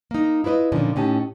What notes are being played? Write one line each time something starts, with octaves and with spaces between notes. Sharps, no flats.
A#3 D#4
E4 F4 B4 D5 D#5
A#2 D3 D#3 F3 C#4
A2 C#4 D#4 G4 A5